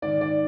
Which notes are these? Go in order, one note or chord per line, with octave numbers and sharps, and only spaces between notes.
G#2 D#3 D5
D5